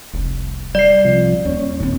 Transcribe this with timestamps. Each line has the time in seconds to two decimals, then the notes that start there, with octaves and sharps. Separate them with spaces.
0.14 F1 C2
0.75 G3 D5 C7
1.05 C3 F3
1.45 D#2 C#4
1.80 A#2 D#3 C4 E4